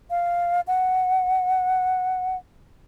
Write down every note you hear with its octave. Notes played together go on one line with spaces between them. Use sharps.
F5
F#5